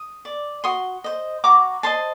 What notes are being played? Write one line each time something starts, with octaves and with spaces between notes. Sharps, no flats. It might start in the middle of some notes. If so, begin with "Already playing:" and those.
Already playing: D#6
D5
F#4 C6 D#6
C5 D#5
F#4 A#5 D6
C5 D#5 A5 C6